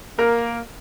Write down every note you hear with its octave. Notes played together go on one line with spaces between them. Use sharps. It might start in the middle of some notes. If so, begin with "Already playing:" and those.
A#3 A#4